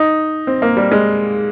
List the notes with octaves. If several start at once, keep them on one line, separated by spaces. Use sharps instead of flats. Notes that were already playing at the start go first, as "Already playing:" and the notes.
Already playing: D#4
C4
A#3
G3
G#3